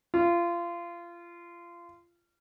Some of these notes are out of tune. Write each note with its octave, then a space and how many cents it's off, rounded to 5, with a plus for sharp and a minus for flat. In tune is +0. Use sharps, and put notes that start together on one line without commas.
F4 -25